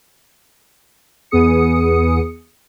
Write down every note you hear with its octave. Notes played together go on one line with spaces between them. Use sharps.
E2 B3 G#4 D#6 C#7